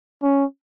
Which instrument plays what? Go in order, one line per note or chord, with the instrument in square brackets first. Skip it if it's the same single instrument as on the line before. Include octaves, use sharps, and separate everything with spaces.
[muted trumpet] C#4